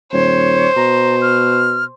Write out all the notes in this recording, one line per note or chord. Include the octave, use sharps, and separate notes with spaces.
D#1 C5 C#5
B2 A#5
F6